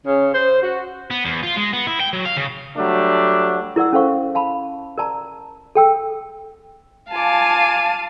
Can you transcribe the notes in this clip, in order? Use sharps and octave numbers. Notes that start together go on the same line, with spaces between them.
C#3
C5
F#4
B3
E2
F4
G#3
B3
E4
G5
F#3
F5
C#3
F#3 G3 A3 D4
E4 A#4 D5 F#5 E6
C#4 A4 C5 F5 C#6
F5 A5 B5
A#4 D5 A5 A#5
A4 G5 E6
F4 F5 G#5 A5 D6 D#7